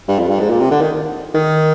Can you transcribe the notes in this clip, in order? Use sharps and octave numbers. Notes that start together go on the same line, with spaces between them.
G2
F2
G2
G#2
A#2
C3
D3
D#3
D#3